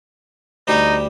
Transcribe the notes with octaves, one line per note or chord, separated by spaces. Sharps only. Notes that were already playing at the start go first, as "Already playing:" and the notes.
D2 G3 D#4 G4